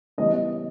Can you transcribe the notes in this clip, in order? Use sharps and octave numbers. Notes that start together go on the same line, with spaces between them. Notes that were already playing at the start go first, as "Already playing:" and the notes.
C#3 E3 G3 B3 E4 D#5